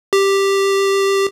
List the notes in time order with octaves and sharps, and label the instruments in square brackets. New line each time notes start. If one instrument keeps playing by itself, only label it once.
[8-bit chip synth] G4